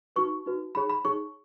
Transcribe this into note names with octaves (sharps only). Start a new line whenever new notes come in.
D#4 F#4 B4 C#6
D#4 F#4 B4
D#4 G#4 C#5 B5
B5
D#4 G#4 C#5 C#6